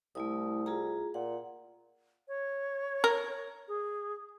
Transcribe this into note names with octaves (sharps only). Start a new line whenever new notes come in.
C2 A3 E4 D#6
F4 G#4 A#5
A#2 F#5
C#5
A#4
G#4